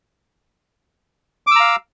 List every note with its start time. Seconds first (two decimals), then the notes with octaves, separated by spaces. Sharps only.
1.47 D6
1.51 E6
1.56 A#5
1.60 F5